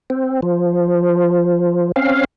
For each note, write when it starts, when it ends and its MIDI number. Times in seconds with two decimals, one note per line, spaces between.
0.10 0.40 60
0.42 1.92 53
1.96 2.25 60
1.96 2.25 61
1.96 2.25 77